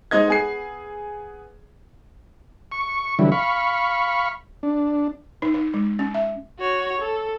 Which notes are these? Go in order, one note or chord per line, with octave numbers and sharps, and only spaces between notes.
G#3 D#4 C5 D#5 G#6
B3 G#4 C7
C#6
D3 E3 F#3 G3 E4
F5 B5 C#6
D4
D#4
D#4
G#3
C#4
E5
F#4 C#5
A4